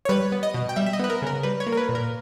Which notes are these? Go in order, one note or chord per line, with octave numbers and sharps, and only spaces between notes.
C#5
G3 B4
B3
D#5
B2
G5
G3 E5
E5
D#5
B3 B4
A#4
C#3 A#4
G3 B4
C#5
A#3
A#4
B4
A#2
A#4